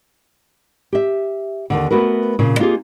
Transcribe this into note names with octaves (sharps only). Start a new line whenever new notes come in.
G4 E5
D#2 G#2 D3
A3 B3 F#4 A#4 B4
A#2 C#3
A#3 D#4 F4 G4 G#4 F5